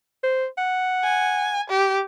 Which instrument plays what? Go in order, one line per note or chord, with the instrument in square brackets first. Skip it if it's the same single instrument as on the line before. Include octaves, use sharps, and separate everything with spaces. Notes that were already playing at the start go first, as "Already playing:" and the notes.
[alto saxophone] C5
F#5
[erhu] G#5
G4